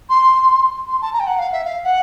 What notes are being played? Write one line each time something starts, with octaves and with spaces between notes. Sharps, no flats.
C6
C6
A5
A#5
G5
F#5
F5
E5
F5
F#5